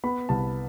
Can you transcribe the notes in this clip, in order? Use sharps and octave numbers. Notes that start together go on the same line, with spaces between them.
B3 B5
C2 A5